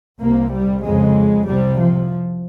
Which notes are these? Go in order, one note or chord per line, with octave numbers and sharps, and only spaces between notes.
C2 C3 A#3
G3
F2 C#3 G#3
C2 C3 G3
F3